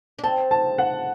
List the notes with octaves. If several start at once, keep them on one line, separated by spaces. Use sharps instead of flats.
D4
C4 A5
A5
F#5